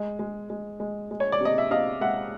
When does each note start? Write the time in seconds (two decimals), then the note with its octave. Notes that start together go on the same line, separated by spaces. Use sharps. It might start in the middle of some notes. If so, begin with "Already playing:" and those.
Already playing: G#3
0.19 G#3
0.50 G#3
0.80 G#3
1.11 G#3
1.20 C#5
1.32 D5
1.41 C3 D#5
1.58 E5
1.71 C3 D#5 F5
2.01 G#3 E5 F#5